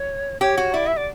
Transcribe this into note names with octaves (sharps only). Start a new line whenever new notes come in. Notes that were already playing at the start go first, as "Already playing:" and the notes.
Already playing: C#5
G4 C#5
F#4
E4 D5
E5
D5